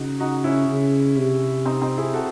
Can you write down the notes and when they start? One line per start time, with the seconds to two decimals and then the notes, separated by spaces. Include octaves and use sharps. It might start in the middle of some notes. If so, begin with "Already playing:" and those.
Already playing: C#3 D#4 F#4
0.20 D#4 F#4
0.44 C#4 E4
0.69 C#3
1.17 C3
1.66 C4 D#4
1.82 C4 D#4
1.98 E4 G#4
2.13 F#4 A4